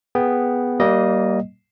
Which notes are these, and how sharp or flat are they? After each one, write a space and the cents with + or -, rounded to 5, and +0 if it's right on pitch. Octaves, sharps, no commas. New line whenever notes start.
B3 +0 G#4 +0 G5 +0
G3 -30 A#3 +0 D#5 +0